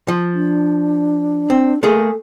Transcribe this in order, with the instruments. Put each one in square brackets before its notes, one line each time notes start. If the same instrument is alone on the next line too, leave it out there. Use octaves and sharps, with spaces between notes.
[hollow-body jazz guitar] F3
[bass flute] D4
[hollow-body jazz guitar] C4
[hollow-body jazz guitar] A3 A#3 G#4 [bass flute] A4